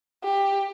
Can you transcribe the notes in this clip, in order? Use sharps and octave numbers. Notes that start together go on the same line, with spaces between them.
G4